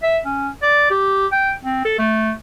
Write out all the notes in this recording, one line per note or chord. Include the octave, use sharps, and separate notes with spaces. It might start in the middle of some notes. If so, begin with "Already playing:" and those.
E5
C#4
D5
G4
G5
C4
A4
A3